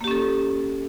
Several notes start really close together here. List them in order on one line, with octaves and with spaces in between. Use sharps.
A#3 G4 C#4 A4